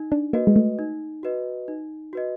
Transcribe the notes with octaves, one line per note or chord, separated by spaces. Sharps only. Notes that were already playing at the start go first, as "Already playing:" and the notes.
Already playing: D#4
D4
A#3 F#4 B4 D#5
G#3
A3
D#4
F#4 B4 D#5
D#4
F#4 B4 D#5